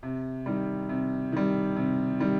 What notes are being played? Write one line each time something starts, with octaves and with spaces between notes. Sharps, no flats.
C3
D#3 G3
C3
D#3 G3
C3
D#3 G3